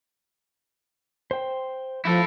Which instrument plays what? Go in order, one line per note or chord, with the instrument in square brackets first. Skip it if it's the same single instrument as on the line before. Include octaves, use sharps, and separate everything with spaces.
[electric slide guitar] C5 G5
[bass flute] F3 [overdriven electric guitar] E4 A4